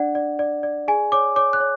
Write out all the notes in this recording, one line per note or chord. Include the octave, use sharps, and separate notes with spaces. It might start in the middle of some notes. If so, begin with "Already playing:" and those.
Already playing: D4 D5 F#5
D5
D5
D5
G#4 G#5
C#5 D6
C#5 D6
F#6
C#5